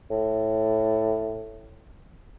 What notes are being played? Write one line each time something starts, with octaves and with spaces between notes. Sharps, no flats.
A2